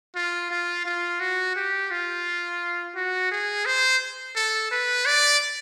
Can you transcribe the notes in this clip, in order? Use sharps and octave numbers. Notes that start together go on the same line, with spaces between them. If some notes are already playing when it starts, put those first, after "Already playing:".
F4
F4
F4
F#4
G4
F4
F#4
G#4
C5
A4
B4
D5